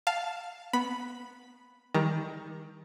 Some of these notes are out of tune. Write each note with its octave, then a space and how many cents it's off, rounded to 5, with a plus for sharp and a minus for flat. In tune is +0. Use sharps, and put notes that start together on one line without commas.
F5 +0 A5 +0
B3 +0 B5 +0
D#3 +25 G3 +25 A#5 +0